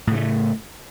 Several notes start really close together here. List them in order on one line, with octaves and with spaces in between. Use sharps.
A2 C#3 A3